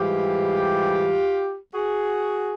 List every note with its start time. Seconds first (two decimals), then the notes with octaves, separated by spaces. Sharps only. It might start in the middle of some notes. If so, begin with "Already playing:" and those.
Already playing: G#2 E3 G3 F4 G4
1.73 F#4 G#4